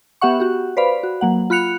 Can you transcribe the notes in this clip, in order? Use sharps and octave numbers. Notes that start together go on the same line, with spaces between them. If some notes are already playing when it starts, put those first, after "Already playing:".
B3 G4 E5 F#5 C#6
F#4 G4
B4 C5 D5 F5 B5
F#4
F#3 A#3 F#5
F4 B5 F#6 C#7 F7